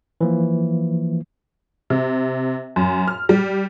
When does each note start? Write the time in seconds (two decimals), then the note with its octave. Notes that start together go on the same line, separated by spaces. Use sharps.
0.21 E3 F3 A#3
1.90 C3
2.76 F#2
3.08 F6
3.29 G3